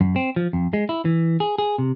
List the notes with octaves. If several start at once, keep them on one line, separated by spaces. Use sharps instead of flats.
F#2
C4
F3
F2
G#3
E4
E3
G#4
G#4
C3